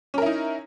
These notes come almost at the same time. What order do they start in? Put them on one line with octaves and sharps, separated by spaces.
C#4 A#4 E4 D#4